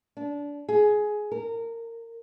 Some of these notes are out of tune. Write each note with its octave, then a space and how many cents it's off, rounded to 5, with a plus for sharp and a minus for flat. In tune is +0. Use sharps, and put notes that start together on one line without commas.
D4 -25
G#4 +15
A#4 -20